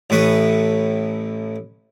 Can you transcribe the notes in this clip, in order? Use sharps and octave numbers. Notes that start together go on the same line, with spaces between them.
A1 A2 B4 C#6 D#6